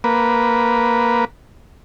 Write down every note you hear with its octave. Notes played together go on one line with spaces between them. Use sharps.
A#3 B4